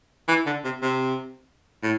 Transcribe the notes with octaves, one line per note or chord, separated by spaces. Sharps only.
E3
D3
C3
C3
A2